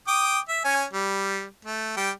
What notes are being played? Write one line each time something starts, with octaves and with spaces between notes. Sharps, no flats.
G5 D6 D#6
E5
C#4 G#5
G3
A3
G3 G5